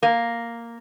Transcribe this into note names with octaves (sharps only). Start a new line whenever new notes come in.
A#3